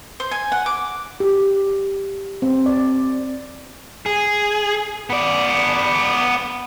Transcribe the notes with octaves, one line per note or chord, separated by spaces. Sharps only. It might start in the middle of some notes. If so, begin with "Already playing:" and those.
C5
G#5
F#5
D6
G4
C4
D5
G#4
B3 D5